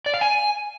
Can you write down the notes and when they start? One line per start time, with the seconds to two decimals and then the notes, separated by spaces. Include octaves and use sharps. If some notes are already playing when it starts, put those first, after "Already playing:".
0.06 D5
0.14 F5
0.21 G#5